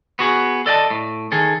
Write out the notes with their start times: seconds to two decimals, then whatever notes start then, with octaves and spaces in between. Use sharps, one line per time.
0.19 B3 F#4 G#4
0.66 A4 D5 D#5 F#5 A5
0.90 A2
1.32 D#3 G#4 A4